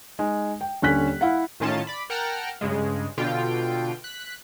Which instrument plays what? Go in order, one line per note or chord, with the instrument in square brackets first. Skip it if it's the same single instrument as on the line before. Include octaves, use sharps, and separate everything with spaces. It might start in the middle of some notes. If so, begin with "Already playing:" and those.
[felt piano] G#3 D#4
G5
D#1 D3 C#4 F#6 B6
E4 F5 F#5
[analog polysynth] A2 D#3 C#4 F4 A5
D5 B5
A#4 F#5 G5 A5 A#5 F6
G2 C#3 G#3
B2 D3 F4 G5
F#6 B6